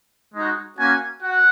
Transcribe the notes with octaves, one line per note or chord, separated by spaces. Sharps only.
G#3 D#4 F#4
A#3 C#4 F#4 G#5
F#4 F#5